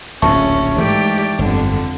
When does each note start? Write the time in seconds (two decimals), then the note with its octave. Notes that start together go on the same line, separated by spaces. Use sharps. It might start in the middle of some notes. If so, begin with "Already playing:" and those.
0.22 D1 A#1 D#2 C#4 E5 A5 C#6
0.78 G#2 E3 A3 G4 D5
1.39 G1 F2 D3